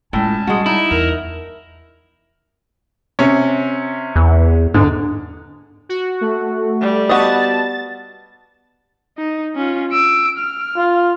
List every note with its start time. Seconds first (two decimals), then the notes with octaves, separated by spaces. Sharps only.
0.13 A2 G#3 C#4 F4 G#5 A5
0.47 G3 G#3 F#4
0.66 D#4 E4
0.91 E2 A#4
3.19 C3 C#4
4.16 E2
4.74 G#2 D3
5.89 F#4
6.21 A3
6.80 G3
7.09 B3 F#4 D#5 A5 A6
9.18 D#4
9.56 C#4 F4
9.92 E6 D7
10.38 F6
10.76 F4